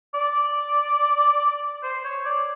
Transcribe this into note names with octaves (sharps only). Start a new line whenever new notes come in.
D5
C5
C#5
D5